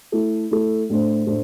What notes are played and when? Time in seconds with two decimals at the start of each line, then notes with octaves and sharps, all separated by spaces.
0.12 A3 E4 A4
0.51 A3 E4 A4
0.89 A2 A3 D4 C5
1.27 A2 A3 D4 C5